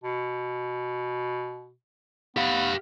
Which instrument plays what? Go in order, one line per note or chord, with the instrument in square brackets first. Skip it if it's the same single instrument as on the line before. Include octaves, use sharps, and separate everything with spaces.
[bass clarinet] B2
[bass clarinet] B3 [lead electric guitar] G4 F5